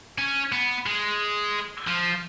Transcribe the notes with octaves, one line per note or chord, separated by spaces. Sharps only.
C#4
B3
G#3
F3